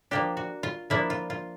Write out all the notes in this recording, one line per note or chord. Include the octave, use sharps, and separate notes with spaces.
F3 A#3 D4 G4
F#4
F4
F3 A#3 D4 E4
F4
F4